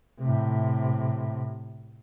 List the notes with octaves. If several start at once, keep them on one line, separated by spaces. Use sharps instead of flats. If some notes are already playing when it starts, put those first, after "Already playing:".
A2 C3